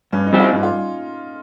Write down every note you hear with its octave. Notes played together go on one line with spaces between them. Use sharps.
G2 C#4
D#4
G3 C4 G4
F4
G2
F4